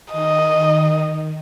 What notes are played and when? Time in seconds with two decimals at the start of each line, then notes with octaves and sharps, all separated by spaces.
0.13 D#3 D#5